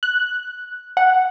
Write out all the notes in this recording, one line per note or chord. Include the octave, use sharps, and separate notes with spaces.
F#6
F#5